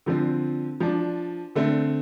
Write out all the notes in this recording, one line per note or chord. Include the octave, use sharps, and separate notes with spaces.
D3 F3 C4
F3 D4
D3 A3 C4